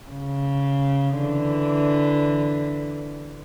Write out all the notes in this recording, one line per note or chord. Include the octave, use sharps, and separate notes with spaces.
C#3
D3 E3